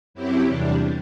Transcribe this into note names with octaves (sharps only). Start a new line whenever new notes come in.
F#2 F#3 C4 E4 G4
E2 C3 G3 D4